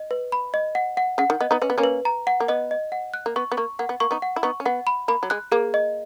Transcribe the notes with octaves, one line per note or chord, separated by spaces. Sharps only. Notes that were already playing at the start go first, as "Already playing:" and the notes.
Already playing: D#5
B4
B5
D#5
F#5
F#5
C#3 F#5
D#3
B3 D#5
B3 D#4
C#4 B4
B3
A#3 C#4
B4
A#5
F#5
A#3
B3 D#5
D#5
F#5
F#6
A#3
B3 C#6
B3
A#3 C#6
A#3 F#5
B3
A#3 C#6
B3 D#4
F#5
E4
B3 D#4 C#6
C#4
B3 F#5
B5
A#3 B5
F#3
G#3 F#6
A#3 G#4
D#5